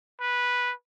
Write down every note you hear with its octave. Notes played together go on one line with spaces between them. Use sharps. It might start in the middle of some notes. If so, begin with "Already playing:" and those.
B4